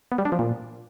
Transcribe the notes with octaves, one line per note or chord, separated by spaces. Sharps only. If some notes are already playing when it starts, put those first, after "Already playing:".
B3
G3
D4
F3
A#2